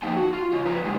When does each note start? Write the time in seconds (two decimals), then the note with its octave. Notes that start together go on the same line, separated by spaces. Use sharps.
0.03 F3 A#3 D#4 F5 G5 A5
0.16 F#4
0.33 F4
0.52 C#3 F4
0.65 F2 B4 A#5
0.84 C3 D#3 G3 G#3